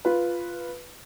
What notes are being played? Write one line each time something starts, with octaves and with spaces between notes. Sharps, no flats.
F4 B4